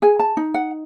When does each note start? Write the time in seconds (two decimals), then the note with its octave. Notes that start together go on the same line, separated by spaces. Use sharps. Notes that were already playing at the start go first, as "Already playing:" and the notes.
0.02 G#4 G#5
0.19 A5
0.37 D#4
0.54 F#5